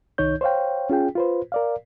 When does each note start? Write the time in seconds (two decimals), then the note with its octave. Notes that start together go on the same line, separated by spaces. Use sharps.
0.18 C2 D#3 D#4 C#5 G6
0.41 C5 C#5 F5 G5
0.90 C#4 F4 G#4 G5
1.15 F4 B4 C5
1.52 A#4 D5 F5